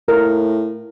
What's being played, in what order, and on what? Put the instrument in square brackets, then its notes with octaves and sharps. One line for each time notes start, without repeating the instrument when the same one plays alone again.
[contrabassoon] A2 [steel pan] A#4